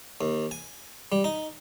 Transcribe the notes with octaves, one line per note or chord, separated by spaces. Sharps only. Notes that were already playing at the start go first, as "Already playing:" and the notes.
D#2
G#5
G3
D#4